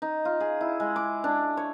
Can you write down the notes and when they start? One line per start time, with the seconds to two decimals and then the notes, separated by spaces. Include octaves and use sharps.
0.02 D#4
0.25 F4
0.40 G#4
0.61 E4
0.80 G#3
0.96 D6
1.24 D4
1.57 C#5